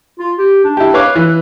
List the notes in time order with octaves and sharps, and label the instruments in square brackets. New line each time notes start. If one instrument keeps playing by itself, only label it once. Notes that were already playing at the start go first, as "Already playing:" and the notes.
[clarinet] F4
G4
D4
[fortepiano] E4 G4
[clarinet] B4 [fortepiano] C#5 F5 D6
[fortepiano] E3